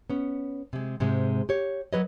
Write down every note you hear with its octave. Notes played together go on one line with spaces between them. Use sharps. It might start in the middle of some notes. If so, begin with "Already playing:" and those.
B3 C#4
C3 G#3
G#2 C3 G#3
G4 C#5
F#3 A#4 B4 C#5 D#5